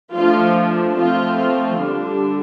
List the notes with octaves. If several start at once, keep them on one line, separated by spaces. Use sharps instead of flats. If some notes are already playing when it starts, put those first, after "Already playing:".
F3 A3 D4 F4
F3 A3 C4 F4
F4
D3 G3 D4